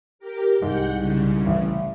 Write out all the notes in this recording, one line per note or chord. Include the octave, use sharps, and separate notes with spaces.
G4 A#4
C2 G#2 F#5 G5 G6
C#3
A1